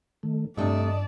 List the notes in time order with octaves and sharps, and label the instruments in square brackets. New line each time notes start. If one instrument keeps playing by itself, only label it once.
[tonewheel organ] D#3 A3
[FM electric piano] G2 [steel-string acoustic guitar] C3 A3 [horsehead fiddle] D5 A5 [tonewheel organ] D#5